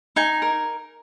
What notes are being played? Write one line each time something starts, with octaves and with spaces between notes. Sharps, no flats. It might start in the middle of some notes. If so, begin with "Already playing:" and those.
D#4 G#5
A#4